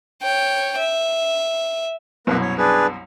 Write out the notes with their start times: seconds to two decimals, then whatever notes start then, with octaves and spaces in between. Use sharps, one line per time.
0.22 C#5 G5
0.78 E5
2.27 C2 F#2 B2 A#3 B4
2.41 C#5
2.58 D4 G#4 B4